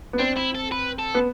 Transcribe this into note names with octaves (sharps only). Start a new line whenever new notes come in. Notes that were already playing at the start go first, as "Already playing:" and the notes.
B3
C4 D4
E4
A4
B4
A4
B3